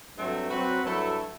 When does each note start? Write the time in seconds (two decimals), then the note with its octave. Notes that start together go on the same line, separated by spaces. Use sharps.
0.16 G2 F#3 A3 C4
0.49 F#3 C4 F#4 B4
0.83 G2 F#3 A3 E4 A4